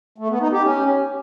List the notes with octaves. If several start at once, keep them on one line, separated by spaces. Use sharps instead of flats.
A3
B3
D#4
G4
C#4